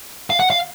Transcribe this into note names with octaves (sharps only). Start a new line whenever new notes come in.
F5
F#5
F5